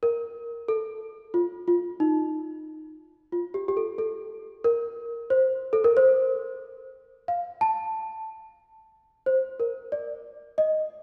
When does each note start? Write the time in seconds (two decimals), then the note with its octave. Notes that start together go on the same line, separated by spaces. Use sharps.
0.03 A#4
0.68 A4
1.34 F4
1.68 F4
2.00 D#4
3.32 F4
3.54 G4
3.68 G4
3.77 A4
3.98 A4
4.64 A#4
5.30 C5
5.73 A4
5.84 A#4
5.97 C5
7.28 F5
7.61 A5
9.26 C5
9.60 A#4
9.92 D5
10.58 D#5